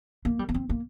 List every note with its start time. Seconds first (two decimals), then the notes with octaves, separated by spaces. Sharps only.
0.25 A#3
0.39 G3
0.49 A#3
0.54 C4
0.69 A#3